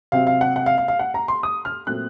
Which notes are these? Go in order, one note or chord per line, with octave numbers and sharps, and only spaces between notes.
C3 F#3 C4 F5
F5
F#5
F#5
F5
F5
F5
F#5
A#5
C6
D#6
F6
A#2 F#3 A3 C4 F#6